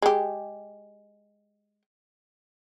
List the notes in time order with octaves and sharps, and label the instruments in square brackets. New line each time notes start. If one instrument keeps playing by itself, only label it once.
[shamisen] G#3 G4